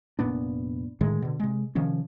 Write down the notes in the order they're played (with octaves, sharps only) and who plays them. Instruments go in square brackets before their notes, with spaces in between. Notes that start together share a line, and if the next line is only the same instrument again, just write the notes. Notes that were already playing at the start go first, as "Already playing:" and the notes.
[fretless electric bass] F1 A#2 B3 D4
D2 A2 D#3 G#3
B2 D3
C3 G#3
C3 D#3 F3 C#4